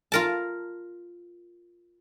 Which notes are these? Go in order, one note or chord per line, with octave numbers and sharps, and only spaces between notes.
F4 A#4 A5